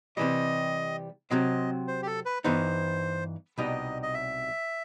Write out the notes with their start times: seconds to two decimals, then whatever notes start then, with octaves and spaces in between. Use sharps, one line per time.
0.17 C3 E3 G3 D#5
1.31 C3 F#3 C4 D#5
1.88 C5
2.02 G4
2.07 A4
2.25 B4
2.44 G2 E3 B3 D#4 C5
3.58 C2 B2 G3 D#4 D#5
4.03 D#5
4.14 E5